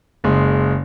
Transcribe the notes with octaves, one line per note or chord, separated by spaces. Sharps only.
F#1 G#3 C6